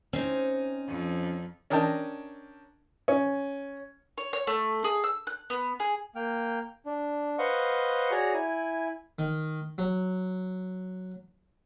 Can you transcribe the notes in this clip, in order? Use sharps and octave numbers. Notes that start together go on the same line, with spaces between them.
C4 C#4 D#4
F2
C#4 D4 A#4 D#5 G5 A5
C#4
C#5
C#5
A3
G#4
E6
F#6
B3
G#4
A#3 G5 F6
D4
B4 C5 D#5 F5 F#5 C#6
F#4 G#4 C#5 D5 A#5
E4 G#5
D#3
F#3